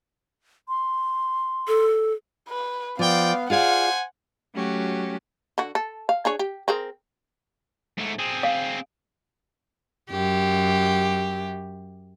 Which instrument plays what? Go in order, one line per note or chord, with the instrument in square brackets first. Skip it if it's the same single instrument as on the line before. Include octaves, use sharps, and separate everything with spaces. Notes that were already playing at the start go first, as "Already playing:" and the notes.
[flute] C6
[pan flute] A4
[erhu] B4
[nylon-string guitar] F3 [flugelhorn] B3 [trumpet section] D5 G5 [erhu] F5
[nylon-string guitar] F4 G#4 D5 [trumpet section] C5 G#5 [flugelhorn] F5 [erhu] F#5
[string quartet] F#3 A3 C#4 F#4 G4
[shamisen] D3 F#4
A4
F5
D4 G#4 C#5
G4
C4 G#4 A#4
[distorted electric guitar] G#2 A3
C4 G#4
[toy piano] F5
[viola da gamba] F#2 G4